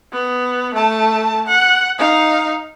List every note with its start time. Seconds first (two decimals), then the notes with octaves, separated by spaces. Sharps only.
0.12 B3
0.74 A3 A5
1.47 F#5
1.98 D#4 F5